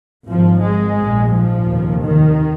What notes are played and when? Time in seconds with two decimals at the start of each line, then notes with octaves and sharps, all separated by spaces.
0.29 G#1 G#2 F3
0.63 G#3
0.98 A#1 G#2
1.33 F3
1.67 F1 D#2
2.01 D#3